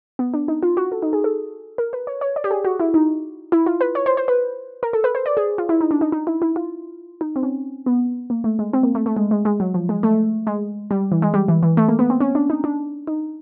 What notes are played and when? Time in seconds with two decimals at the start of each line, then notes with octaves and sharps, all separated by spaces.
0.19 B3
0.34 D4
0.48 D#4
0.63 F4
0.77 F#4
0.92 A4
1.02 D#4
1.13 G#4
1.24 A4
1.78 A#4
1.93 B4
2.07 C#5
2.21 C#5
2.36 D5
2.44 G4
2.51 G#4
2.65 F#4
2.80 E4
2.94 D#4
3.52 E4
3.66 F4
3.81 B4
3.95 C#5
4.06 C5
4.17 C5
4.28 B4
4.83 A#4
4.93 A4
5.04 B4
5.15 C5
5.26 D5
5.37 G#4
5.58 F4
5.69 E4
5.81 D#4
5.91 D4
6.01 D#4
6.12 D#4
6.27 E4
6.42 E4
6.56 F4
7.21 D#4
7.36 C4
7.43 C#4
7.86 B3
8.30 A#3
8.44 A3
8.59 G#3
8.73 C4
8.83 A#3
8.95 A3
9.06 A3
9.17 G#3
9.31 G#3
9.45 G#3
9.60 F#3
9.74 F3
9.89 G#3
10.03 A3
10.47 G#3
10.91 G3
11.12 E3
11.22 G#3
11.34 G3
11.48 E3
11.63 E3
11.77 A3
11.88 A#3
11.99 B3
12.10 C4
12.20 C#4
12.35 D4
12.50 D#4
12.64 D4
13.07 D#4